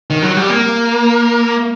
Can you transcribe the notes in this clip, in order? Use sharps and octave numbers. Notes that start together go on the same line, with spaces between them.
D#3
F#3
G3
A#3